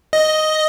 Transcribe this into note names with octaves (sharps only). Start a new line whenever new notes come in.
D#5